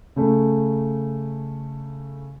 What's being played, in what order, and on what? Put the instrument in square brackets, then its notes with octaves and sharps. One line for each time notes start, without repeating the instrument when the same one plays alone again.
[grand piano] C#3 A3